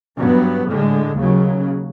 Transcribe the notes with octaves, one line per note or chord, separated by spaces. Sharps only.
G2 F#3 B3
A2 D3 G#3
D#2 C#3 F#3